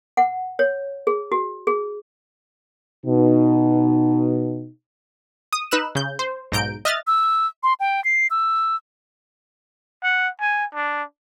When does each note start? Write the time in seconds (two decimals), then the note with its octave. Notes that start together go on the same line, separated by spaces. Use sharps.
0.17 F#5
0.59 C#5
1.07 G#4
1.32 F#4
1.67 G#4
3.06 B2 D#4
5.53 D#6
5.71 D#4 B4 E6 F#6 E7
5.95 C#3 G6
6.19 C5
6.52 B1 G#2 A#5 G6 D7
6.85 D#5 E5 F6 F#6 A6
7.07 E6
7.63 C6
7.80 G5
8.04 C7
8.30 E6
10.03 F#5
10.40 G#5
10.75 D4